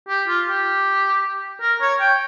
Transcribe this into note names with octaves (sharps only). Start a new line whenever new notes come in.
G4
F4
G4
A#4
C#5
G5